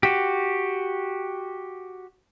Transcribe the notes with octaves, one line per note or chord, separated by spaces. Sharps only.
F#4 G4